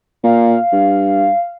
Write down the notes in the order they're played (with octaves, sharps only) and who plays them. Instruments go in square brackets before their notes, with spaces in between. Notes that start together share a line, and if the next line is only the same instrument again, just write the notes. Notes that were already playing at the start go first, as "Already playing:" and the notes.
[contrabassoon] A#2 [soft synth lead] F5
[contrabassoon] G2